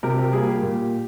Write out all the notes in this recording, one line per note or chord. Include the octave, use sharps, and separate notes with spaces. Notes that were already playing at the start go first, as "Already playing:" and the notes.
C3 G4 A#4
G4 A#4
G3 A#3 G#4
G4
A#2